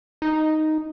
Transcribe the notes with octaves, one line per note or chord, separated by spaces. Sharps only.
D#4